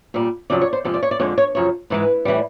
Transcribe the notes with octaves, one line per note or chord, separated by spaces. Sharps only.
A#2 G3
F2 C#3 F#3 D5
C#5
C5
F2 C3 F3 G#3
D5
C#5
D5
F2 D3 F3 G#3 C#5
C#5
F#2 C#3 F3 C#5
G#2 E3 G#3 B4
A2 E3 G3